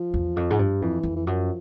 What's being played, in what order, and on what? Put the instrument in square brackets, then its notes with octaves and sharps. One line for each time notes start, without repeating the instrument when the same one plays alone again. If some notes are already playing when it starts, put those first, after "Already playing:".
Already playing: [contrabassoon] F3
[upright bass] E2
F2
G#2
G2
[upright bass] F2 [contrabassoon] E3
[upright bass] F2
[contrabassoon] E3
[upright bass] F#2 [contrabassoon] F3